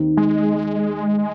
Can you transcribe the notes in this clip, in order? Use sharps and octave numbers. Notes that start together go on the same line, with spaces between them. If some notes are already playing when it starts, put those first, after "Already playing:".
Already playing: D#2 D#3 C4 D#4
G#3